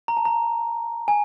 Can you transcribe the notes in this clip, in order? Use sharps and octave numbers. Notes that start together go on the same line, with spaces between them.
A#5
A5
A#5
G#5